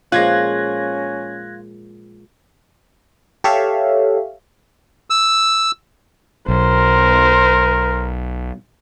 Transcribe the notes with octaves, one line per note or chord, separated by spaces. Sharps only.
A#2 F3 G#3 C#4 F4 F#6 G#6 A#6
G4 A4 C#5 E5 F5
E6
B1 A#4 C5